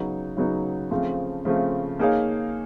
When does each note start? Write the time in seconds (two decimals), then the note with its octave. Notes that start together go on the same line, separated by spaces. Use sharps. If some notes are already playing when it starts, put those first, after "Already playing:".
Already playing: C#3 F#3 B3 D#4
0.37 C#3 F#3 B3 D#4
0.91 C#3 F3 A3 C4 F4
1.45 C#3 F3 A3 C4 F4
1.99 A#3 D#4 G#4 C#5 F5